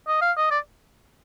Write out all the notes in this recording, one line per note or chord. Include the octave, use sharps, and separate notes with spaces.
D#5
F5
D#5
D5